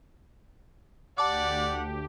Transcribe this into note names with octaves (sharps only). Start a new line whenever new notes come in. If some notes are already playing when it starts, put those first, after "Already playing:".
D2 G4 D5 F#5 A5 D6